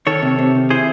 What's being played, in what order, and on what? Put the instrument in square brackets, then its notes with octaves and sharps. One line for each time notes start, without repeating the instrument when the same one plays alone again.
[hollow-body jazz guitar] D#3 [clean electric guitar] A4 C#5
[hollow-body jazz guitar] C3
C3
D#3
[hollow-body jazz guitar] E4 [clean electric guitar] G#4 C5